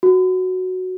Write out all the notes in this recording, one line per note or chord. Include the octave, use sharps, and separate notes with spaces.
F#4